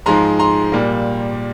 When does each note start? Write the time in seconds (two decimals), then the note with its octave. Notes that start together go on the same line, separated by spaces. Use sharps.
0.06 G#2 F3 G#3 A#5 C6
0.39 A#5 C6
0.72 A#2 G3 A#3